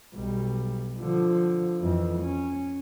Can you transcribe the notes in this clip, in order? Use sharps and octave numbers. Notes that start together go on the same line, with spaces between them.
B1 G3
D3 F3
F2 E3
C#4